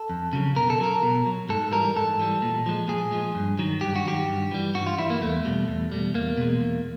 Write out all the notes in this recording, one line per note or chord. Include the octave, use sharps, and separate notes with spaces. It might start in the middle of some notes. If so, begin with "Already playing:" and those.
Already playing: A4
F2
C#3 F#3
B2 A#4
A4
F#3 A#4
B2
F#3
G#2 A4
E3 G3 A#4
G#2 A4
E3 G3
A#2
F3 G#3
A#2 G#4
F3 G#3
G2
D#3 F#3
G2 G4
F#4
D#3 F#3 G4
G2
E3 G3
G2 F#4
F4
E3 G3 E4
A#3
E2 A3
B2 G3
E2
B2 G3
E2 A#3
B2 G#3
E2